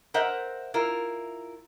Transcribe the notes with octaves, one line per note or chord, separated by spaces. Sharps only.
A#4 C5 D#5 E5 F#5
E4 F4 A#4